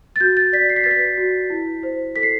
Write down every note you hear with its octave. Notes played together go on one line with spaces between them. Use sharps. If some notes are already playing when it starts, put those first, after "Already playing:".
A6
F#4 G6
A6
D5 B6
C7
B6
B4 A6
B6
F#4
E4
C5
A4 B6
C7